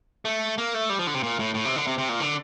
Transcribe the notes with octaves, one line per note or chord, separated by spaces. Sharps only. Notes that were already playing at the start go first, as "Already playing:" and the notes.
A3
A#3
A3
G3
F3
D3
C3
A#2
A2
A2
C3
D3
C3
C3
A#2
D3